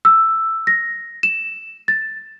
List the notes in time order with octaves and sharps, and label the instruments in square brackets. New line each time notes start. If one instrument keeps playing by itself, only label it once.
[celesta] E6
A#6
E7
A6